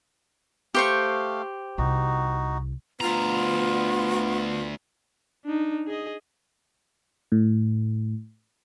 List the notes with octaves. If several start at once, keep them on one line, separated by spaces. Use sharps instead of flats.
A3 G4 C5 F5 C#6
C2 D#4 F#4
D2 B3 F4 A#5
D4 D#4
G#4 D#5
A2